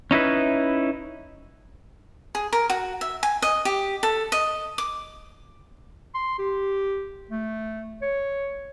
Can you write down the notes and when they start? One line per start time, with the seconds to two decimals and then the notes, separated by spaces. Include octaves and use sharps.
0.11 C#4 D#4 E4 B4
2.35 G#4
2.53 A#4
2.70 F#4
3.01 E5
3.23 G#5
3.42 D#5
3.65 G4
4.03 A4
4.32 D#5
4.78 D6
6.15 C6
6.39 G4
7.31 A3
8.02 C#5